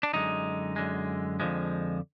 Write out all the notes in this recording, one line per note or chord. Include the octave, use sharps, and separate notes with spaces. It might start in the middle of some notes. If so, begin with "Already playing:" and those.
D4
F#2 D3 G#3 D#4
F#2 D3 G#3
F2 D3 F3 G#3